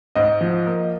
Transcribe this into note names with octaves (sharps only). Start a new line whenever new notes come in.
G#2 D#5
F3
A#3